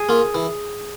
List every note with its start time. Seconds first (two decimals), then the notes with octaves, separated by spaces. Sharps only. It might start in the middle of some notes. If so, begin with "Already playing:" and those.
Already playing: G#4
0.09 A#3 F4
0.34 E3